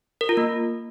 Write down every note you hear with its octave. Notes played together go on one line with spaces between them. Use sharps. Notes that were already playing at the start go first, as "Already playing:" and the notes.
A#4
F4
A#3